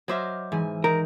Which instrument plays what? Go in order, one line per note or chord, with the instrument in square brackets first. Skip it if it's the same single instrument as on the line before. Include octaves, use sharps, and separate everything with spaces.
[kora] F#3 C5 E5 [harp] D#5 D6 F6
[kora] G#2 [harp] E3 G#5
[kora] D#3 [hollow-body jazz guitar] A#4